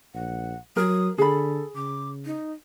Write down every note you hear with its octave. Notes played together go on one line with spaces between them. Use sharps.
A#1 F#5
F#3 A#4 D#6
D3 G#4 A4 B5
C#3 D6
D#4